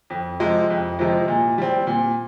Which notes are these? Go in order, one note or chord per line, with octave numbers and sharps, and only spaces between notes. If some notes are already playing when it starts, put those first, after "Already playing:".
F2
C3 F3 G#3
F2
C3 F3 G#3
A#2
G3 C4
A#2